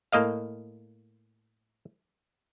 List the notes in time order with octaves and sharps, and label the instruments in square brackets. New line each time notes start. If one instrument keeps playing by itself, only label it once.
[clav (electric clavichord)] A2 A#3 D#5 F5